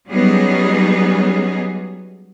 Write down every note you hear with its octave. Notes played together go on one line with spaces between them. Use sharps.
F#3 G3 B3 C#4 D#4 G#4